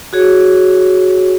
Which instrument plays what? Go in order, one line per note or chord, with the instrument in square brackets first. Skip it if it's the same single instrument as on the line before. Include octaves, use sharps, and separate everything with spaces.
[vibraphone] F#4 G#4 C#5